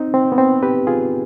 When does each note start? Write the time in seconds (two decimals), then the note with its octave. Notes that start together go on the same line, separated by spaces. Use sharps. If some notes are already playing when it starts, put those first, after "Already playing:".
Already playing: C4 D#4
0.14 C4
0.32 B3
0.38 C4
0.63 G4 B4
0.87 F4 G#4